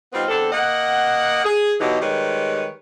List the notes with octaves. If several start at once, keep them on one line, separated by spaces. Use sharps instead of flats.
G3 B3 C4 D#4 F4
E2 C4 D4 A4
A#3 D#5 F#5
G#4
B2 E3 F#3 D#4 G4
D#3 G3 G#3 B4 C#5